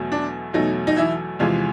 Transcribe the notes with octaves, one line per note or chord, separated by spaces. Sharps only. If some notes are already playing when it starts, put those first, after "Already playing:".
Already playing: E2 B2 F#3 A3
D4
E2 B2 F#3 A3 D#4
D#4
E3 E4
E2 C3 E3 F3 G#3 F4